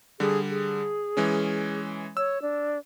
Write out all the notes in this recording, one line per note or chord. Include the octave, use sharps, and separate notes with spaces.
D3 G3 G#4
G#4
E3 G#3 C#4
C#5 E6
D4